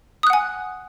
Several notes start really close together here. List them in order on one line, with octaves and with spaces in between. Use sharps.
D#6 F#6 F#5 G#5